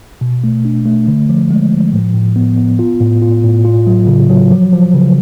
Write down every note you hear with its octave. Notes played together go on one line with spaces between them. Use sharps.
B2
A3
D4
A3
D3
F3
G#3
F3
A2
A2
B3
B3
F4
A2
F4
A2
F4
F#3
C#3
F#3
F3
F3
C#3